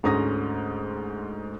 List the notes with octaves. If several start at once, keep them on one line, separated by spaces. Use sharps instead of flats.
D2 G#2 C#4 A#5 D#6 A#6